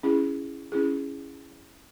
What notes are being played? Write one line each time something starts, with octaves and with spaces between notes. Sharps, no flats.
C#4 E4 G#4
C#4 E4 G#4